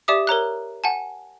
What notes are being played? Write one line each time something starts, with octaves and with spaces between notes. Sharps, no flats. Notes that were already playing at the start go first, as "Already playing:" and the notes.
G4 D5 E5 D6 D#6
A#4 C#5 A#5 F#6
F#5 G#5 A5